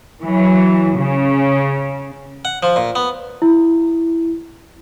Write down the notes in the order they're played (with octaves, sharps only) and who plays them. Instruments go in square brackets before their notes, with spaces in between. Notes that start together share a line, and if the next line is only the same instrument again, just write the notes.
[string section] E3 F#3
C#3
[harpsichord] F#5
F3
A#2
B3
[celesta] E4